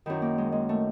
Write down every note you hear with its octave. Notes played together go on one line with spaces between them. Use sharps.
F#2 D#3 E4
A#3
G#3
G#3
A3